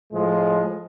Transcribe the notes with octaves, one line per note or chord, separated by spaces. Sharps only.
A2 F3 G#3